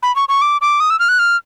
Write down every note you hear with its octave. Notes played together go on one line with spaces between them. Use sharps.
B5
C#6
C#6
D6
D6
D#6
E6
F6
F#6
F6